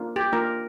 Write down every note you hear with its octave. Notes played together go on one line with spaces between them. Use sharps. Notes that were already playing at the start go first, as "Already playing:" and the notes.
Already playing: A#3 D4 F4
G4
A#3 D4 F4 A#4